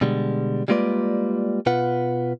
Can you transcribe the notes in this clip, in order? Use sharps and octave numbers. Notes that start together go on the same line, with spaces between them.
B2 D3 G3 G#3
G3 G#3 A#3 F4 B4 D5
B2 F4 B4 F#5